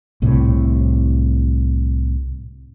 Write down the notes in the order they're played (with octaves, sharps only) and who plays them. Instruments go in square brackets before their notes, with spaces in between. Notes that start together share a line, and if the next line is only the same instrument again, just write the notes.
[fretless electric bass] C2 A2 C3